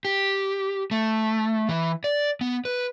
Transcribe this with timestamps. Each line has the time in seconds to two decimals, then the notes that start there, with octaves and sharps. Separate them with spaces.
0.05 G4
0.91 A3
1.69 E3
2.04 D5
2.41 B3
2.65 B4